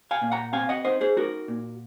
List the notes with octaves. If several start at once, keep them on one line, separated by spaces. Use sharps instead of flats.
F5 G#5
A#2
F#5 A#5
C4 F5 G#5
D#5 F#5
D#4 C5 D#5
G#4 C5
D#4 F#4 A#4
A#2